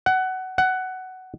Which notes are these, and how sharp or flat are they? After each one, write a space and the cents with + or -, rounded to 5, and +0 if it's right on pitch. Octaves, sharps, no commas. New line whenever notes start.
F#5 +20
F#5 +15